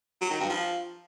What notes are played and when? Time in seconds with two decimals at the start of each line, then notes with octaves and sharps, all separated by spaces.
0.21 F#3
0.31 D#3
0.40 G2
0.49 F3